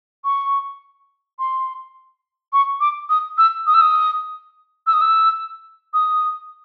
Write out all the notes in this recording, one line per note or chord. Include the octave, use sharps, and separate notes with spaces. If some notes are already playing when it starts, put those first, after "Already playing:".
C#6
C6
C#6
D6
D#6
E6
D#6
E6
D#6
E6
D#6
E6
D#6